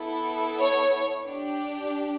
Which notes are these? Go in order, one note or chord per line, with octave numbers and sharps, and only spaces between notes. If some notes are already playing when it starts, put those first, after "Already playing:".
Already playing: B3 E4 A4
C#5
D4 G4